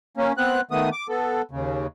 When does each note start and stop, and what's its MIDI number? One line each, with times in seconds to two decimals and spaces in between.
0.17 0.33 58
0.17 0.33 61
0.38 0.61 59
0.38 0.61 60
0.38 0.61 90
0.71 0.89 51
0.71 0.89 57
0.71 0.89 59
0.71 0.89 87
0.92 1.07 86
1.09 1.42 59
1.09 1.42 69
1.51 1.87 39
1.51 1.87 49